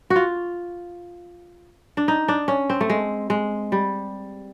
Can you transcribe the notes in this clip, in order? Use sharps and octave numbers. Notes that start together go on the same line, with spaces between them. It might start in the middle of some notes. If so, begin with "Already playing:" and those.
F#4
F4
D4
D#4
D4
C#4
C4
A3
G#3
G#3
G3